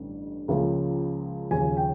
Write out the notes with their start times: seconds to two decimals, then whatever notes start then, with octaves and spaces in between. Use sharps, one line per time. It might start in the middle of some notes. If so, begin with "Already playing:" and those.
Already playing: A1 G2 D3
0.48 C#2 C#3 F3 A#3
1.51 D#2 C#3 F3 G#5
1.77 G5